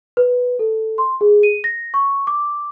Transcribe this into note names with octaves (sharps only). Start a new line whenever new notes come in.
B4
A4
C6
G#4
D#7
A#6
C#6
D6